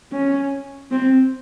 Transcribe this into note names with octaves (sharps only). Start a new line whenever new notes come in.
C#4
C4